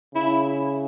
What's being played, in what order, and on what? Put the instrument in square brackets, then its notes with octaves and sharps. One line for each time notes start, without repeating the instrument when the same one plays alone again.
[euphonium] C#3 [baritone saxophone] E4